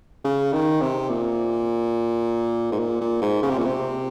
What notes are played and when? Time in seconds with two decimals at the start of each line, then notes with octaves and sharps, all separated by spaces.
0.25 C#3
0.53 D#3
0.81 C3
1.10 A#2
2.72 G#2
2.79 A#2
3.01 A#2
3.22 G#2
3.43 C#3
3.50 C3
3.58 A#2
3.66 C3